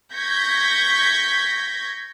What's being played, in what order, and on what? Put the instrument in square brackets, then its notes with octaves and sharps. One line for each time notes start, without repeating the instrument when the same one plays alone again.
[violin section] C#6 G6 G#6 A#6 B6